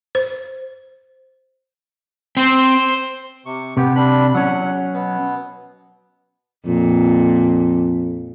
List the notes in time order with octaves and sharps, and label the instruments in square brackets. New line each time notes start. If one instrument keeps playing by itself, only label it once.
[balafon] C5
[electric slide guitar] C4 [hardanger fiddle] C5
[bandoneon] C3 C#6
[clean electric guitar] C3 [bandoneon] B3 G4
[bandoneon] G3 D4 B5
[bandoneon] E2 F#5 [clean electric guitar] F#3 C#4
[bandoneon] B2 B3
[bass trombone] F2 [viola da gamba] A#2